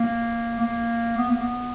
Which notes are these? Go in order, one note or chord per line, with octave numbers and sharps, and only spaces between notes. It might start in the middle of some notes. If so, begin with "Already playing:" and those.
Already playing: A#3
A#3
B3
A#3
B3